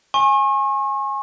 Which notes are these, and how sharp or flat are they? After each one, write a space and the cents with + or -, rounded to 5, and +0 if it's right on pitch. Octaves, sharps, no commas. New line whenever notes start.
G#5 +0 C#6 -40